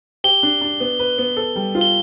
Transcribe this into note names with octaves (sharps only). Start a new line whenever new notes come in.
G4 G7
D4
D4
B3
B4
B3
A4
G3
F4
G7